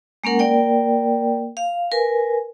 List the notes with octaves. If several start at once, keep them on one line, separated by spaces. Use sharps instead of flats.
G#3 A#3 C#4 A#4 F#5
A#3 A#4 D5 G5
F5
A#4 B4 G#5